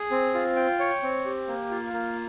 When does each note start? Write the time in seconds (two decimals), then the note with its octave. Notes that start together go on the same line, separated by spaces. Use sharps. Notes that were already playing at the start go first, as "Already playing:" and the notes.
Already playing: G#4
0.11 C4
0.34 F4
0.56 G5
0.79 C#5
1.03 C4
1.25 G4
1.47 A#3
1.71 F4
1.93 A#3